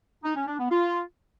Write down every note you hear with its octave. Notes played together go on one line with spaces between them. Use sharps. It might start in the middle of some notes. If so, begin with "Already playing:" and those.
D#4
C#4
D4
B3
F4